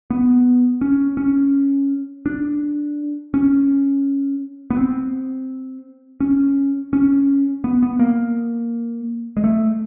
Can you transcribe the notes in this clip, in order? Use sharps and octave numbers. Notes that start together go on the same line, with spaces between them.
B3
C#4
C#4
D4
C#4
B3
C4
C#4
C#4
B3
B3
A#3
G#3
A3